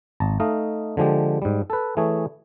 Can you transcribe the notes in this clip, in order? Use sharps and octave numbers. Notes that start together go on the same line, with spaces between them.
G#1 A5 A#5
A3 D#4 D#5 F5
D3 F3 G#3 G4
G#2 G3
A4 B4
E3 A3 G#4 C#5